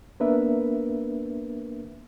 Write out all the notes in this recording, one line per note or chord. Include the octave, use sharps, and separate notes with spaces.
A#3 B3 D4 A#4 B4 E5